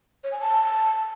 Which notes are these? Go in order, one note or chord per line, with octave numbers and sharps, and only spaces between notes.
C#5
G#5
A5